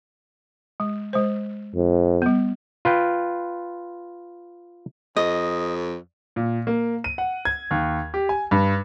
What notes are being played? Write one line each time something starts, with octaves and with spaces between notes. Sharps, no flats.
G#3
G#3 C5
F2
G3 B3
F4 B4 G5
F2 D#5
A#2
A#3
D#7
F#5
G#6
D#2
G4
G#5
G2